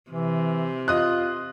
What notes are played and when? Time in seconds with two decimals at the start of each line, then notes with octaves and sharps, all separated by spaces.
0.11 C3 E3
0.88 F4 D#5 D#6 F#6